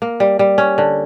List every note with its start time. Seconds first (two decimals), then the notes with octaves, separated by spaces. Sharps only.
0.02 A#3
0.20 G3
0.39 G3
0.58 C#4
0.78 D3